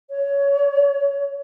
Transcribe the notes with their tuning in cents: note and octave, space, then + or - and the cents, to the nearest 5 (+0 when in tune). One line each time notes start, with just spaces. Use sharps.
C#5 +20